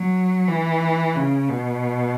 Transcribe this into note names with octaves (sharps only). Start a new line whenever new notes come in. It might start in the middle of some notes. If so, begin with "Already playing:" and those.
Already playing: F#3
E3
C#3
B2